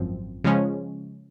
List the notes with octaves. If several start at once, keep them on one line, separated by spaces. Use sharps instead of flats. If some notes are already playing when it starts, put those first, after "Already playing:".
Already playing: G#1 F#2 F3 C4
C#3 F3 G#3 C#4